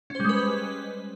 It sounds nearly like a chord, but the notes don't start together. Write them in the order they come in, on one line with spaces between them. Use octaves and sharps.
C#4 C5 G3 G#3 B4